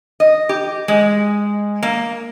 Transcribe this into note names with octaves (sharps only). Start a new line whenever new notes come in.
D#5
G4
G#3
A#3